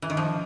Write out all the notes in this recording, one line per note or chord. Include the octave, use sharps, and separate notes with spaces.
E3
D#3
F3